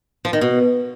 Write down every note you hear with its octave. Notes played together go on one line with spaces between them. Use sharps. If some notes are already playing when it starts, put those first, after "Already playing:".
F3
D#3
B2